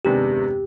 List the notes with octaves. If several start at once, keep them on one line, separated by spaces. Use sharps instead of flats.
C3 D#3 G#3 B3 D4 G4